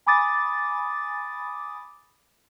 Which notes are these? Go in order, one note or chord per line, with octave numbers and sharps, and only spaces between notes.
G#5 B5 D6 D#6 A6